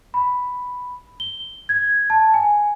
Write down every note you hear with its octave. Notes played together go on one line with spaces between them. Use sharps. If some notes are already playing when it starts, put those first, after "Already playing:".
B5
G7
G#6
A5
G#5